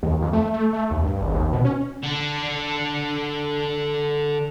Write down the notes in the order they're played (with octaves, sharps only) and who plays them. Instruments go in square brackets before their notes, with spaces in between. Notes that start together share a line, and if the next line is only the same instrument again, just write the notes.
[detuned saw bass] D#2
F2
A3
A3
A3
D#2
G2
G#1
D#2
B2
C#4
[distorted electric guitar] D3 D4